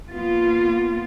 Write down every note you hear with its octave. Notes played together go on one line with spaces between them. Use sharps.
A#3 B3 F4